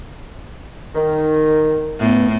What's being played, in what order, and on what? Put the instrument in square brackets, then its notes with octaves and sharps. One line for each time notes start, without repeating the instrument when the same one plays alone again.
[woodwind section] D#3
[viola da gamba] A2 [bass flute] B3